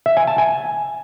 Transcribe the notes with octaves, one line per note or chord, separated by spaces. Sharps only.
E5
G#5
A5
G#5